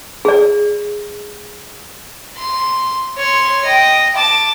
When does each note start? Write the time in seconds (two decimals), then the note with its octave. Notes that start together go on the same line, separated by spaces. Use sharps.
0.25 G#4 D5
2.37 C6
3.17 C#5 C6
3.65 D#5 G5
4.16 A5 D6